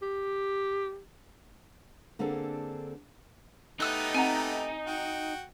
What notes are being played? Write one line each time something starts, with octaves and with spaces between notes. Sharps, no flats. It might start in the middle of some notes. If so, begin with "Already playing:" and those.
G4
D3 A#3 C4 D4 G#4 A4
A3 B3 D#4 G4 D#6 E6 F#6
C4 F#5 G#5 A#5
F#4 G5